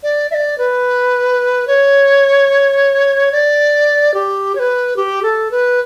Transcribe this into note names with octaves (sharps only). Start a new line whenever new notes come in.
D5
E5
D5
B4
C#5
D5
G4
C#5
B4
G4
A4
B4